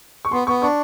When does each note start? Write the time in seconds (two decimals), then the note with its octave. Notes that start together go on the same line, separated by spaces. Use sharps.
0.25 C#6
0.31 B3 C6
0.47 B3 C#6
0.62 D4 C#6